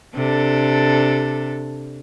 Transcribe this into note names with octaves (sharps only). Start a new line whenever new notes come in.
C3 D4 A4